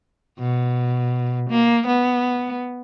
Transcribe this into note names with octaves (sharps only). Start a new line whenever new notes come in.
B2
A#3
B3